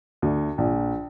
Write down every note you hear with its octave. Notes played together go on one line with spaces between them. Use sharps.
D2
A#1